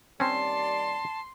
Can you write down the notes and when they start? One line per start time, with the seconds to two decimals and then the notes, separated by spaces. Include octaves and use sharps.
0.20 D#2 G3 C4 C#4 D5 A5 C6